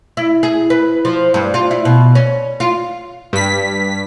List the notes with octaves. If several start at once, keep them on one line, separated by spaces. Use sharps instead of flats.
E4
G#4
B4
F3
G2
F4
E4
B2
C#4
F4
G2 B6